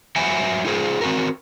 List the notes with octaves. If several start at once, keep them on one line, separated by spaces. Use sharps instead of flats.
F#3 C5 E5 F#5 G#5
D#4 F4 G#4 C5
C4 F#4 A#4